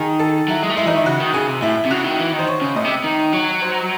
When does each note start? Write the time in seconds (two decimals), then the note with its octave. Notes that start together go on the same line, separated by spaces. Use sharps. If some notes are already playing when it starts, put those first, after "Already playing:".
Already playing: D#3 G#4
0.19 A4
0.48 F#3 E4
0.63 G#3
0.70 A3
0.77 G#3 E4
0.86 E3 D#4
0.96 D#3 E4
1.06 C#3 F#4
1.20 D#3
1.34 C#3 G#4
1.47 C3
1.62 A2 E4
1.86 C3
1.90 C#3 F#4
2.05 D#3
2.19 E3
2.33 D#3
2.39 C5
2.47 C#5
2.61 C#3
2.75 A2 D#5
2.85 C3
3.04 D#3
3.32 F#3 C#5
3.62 C5